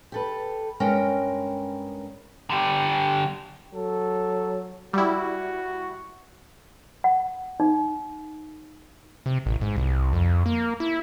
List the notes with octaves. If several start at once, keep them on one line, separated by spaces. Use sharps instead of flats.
G4 A4 B4
G2 G#3 C#4 A#4 G5
D3 G3
F#3 A4
G3 E4 F#4
F#5
D#4
C3
A1
G#2
C2
F2
A#3
E4